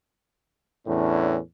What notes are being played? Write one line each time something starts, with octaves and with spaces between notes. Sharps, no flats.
E2 A2 C#4 D4